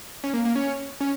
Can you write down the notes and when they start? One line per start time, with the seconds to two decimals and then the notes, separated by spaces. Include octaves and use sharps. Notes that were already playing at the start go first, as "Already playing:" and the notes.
0.24 C#4
0.34 A#3
0.45 A#3
0.55 C#4
1.01 C#4